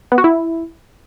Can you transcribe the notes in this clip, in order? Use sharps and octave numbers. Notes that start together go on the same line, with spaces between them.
B3
F#4
E4